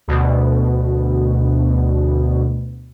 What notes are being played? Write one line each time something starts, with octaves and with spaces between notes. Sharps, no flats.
D2 B2